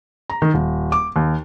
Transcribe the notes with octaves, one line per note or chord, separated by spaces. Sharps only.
A#5
D#3
D#1
D6
D#2